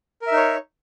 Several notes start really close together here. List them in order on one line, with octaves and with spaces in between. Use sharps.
A#4 E5 D#4 C#5